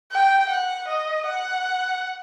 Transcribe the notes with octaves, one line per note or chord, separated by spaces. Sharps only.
G5
F#5
D#5
F#5